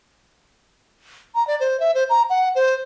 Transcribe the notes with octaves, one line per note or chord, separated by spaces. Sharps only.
A#5
D5
C5
E5
C5
A#5
F#5
C5